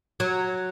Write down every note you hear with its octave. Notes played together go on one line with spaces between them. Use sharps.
F#3